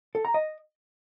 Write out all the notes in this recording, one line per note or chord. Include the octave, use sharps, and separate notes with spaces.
A4
A#5
D#5